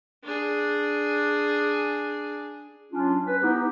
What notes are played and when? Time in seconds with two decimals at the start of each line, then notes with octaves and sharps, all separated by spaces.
0.24 D4 G#4
2.92 F#3 C#4 D4 F4
3.27 B4
3.43 B3 D#4 E4 G4